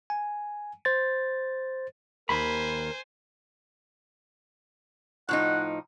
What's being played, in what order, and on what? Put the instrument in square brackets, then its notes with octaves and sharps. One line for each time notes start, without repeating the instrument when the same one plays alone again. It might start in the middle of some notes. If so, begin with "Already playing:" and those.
[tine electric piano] G#5
C5 A6
[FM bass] D#2 [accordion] A#4 [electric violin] C5 G#5 [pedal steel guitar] B5
[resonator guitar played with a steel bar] A2 F3 D#4 [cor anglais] F#5